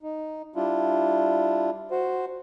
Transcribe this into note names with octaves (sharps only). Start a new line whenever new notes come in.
D#4
G3 D4 E4 F4
F#4 C5